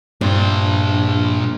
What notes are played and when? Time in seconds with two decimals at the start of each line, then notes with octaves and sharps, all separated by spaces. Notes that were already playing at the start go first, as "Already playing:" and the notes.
0.21 G2 A#2 C5